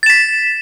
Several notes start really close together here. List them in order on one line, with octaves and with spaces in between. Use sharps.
A6 E7 B6